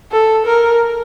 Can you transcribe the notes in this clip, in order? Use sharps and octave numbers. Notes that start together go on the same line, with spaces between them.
A4
A#4